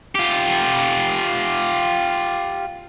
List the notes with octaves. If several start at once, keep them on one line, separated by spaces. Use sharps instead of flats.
F4 G4